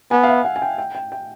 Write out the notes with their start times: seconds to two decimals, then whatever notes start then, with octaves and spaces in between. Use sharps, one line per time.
0.11 B3 G#5
0.23 F5
0.29 E5
0.45 F#5
0.56 G#5
0.62 G5
0.78 G5
0.95 G5
1.12 G5